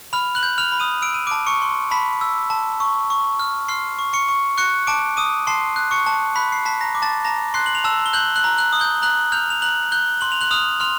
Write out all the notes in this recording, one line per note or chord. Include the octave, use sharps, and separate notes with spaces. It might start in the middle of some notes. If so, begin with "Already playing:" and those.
B5 F6 F7
F#6 F#7
G6
F6 F7
B5
D#6 D#7
E6 D7
D#7
A5 D6 D7
C#6 C#7
C6
A5 B5 B6
E6
A5
C#6
C#6
F6
C6 F6 C7
C#6
C#6 C#7
C#6
C#6 F#6 C#7
A5 D6 D7
D6 D#6 D#7
A5 C6 C7
F#6
C#6 C#7
A5
B5 F#6 B6
C7
A5 B6
A#5 A#6
D6
A5 A6
A5 A#5 A#6
C6 F#6 C7
F#7
F7
A5 E6 E7
G7
F#6 G6 F#7
F#6 F#7
A#5
F#6 F#7
D#6
G6 G7
A#5 F#6 F#7
F6 G6 F7
F7
A#5 F#6 F#7
F#6 G6 G7
C6 F#7
F7
F#6 F#7
D#6 F6 F7
C6 F6 F7